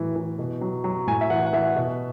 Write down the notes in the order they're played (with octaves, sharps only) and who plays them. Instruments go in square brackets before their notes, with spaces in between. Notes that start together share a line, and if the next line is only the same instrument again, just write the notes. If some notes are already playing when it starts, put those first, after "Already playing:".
Already playing: [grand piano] A2 E3 F#3
E3
B2
F#3
F#3
A2 G#5
E5
E3 F#5
F#5
E3 E5
B2